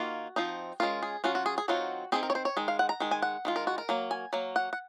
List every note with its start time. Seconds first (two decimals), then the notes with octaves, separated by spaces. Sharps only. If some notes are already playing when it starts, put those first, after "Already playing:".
Already playing: D#3 A#3 F4 F#4
0.36 F3 C4 D#4
0.80 G#3 C#4 F4 A#4
1.03 G#4
1.24 F#3 C#4 F4 F#4
1.35 F#4
1.46 G#4
1.58 G#4
1.68 D#3 F#3 C4 F4 F#4
2.12 D#3 G#3 C4 G#4
2.23 A#4
2.30 C#5
2.35 C5
2.45 C#5
2.57 D#3 G#3
2.68 F5
2.79 F#5
2.89 A#5
3.00 D#3 G#3
3.11 G#5
3.22 F#5
3.45 D#3 G#3 F4
3.56 A#4
3.67 F#4
3.78 A#4
3.89 F#3 A#3
4.11 G#5
4.33 F#3 A#3
4.56 F#5
4.73 F#5